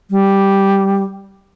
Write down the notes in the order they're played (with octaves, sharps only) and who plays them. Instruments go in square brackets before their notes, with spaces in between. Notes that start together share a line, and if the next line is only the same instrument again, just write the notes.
[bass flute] G3